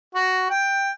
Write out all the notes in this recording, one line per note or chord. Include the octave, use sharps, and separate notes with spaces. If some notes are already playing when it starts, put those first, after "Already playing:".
F#4
G5